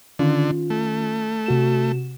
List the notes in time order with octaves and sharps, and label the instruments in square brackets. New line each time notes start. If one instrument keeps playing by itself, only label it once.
[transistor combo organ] D3 [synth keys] D#3 C#4 F4
[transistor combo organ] A3
[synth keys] C3 F#4 E7